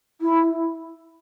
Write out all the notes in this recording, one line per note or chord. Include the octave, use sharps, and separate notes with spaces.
E4